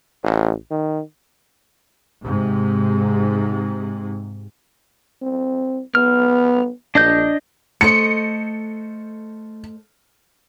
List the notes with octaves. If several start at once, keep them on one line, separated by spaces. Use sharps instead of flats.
A1
D#3
G#2 C3
C4
B3 F6
A#1 D4 D#5 G6
A3 C5 D#5 C#7